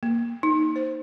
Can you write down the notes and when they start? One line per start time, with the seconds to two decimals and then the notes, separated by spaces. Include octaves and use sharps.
0.03 A#3
0.43 D#4
0.76 C5